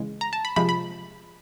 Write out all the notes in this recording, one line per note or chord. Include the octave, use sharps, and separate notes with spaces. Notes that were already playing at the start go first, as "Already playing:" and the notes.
Already playing: C#3 E3 G#3
A#5
A5
B5
C3 F3 G#3 B5
B5